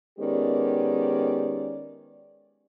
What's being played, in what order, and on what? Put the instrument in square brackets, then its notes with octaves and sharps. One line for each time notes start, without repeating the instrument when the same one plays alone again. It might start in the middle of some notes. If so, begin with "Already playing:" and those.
[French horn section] D#3 G#3 B3 C#4 G4 D5